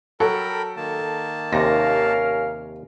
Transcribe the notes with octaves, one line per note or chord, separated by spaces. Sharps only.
F#3 A4 A#4 G5 B5
D#3 A#3 A5
D#2 C3 C#4 A#4 F5 A#6